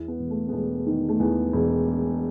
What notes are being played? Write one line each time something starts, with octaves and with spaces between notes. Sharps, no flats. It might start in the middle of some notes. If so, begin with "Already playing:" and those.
Already playing: E2 E4
B3
E1
A3
B3
E1 A3
D#3
A3
E2 B3
E1